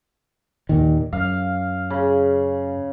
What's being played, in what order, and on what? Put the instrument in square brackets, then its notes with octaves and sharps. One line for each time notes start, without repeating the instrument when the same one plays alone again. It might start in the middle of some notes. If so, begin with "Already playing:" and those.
[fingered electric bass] D#2 A#2 D#3
[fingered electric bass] F#2 [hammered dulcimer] F5
[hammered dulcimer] C#3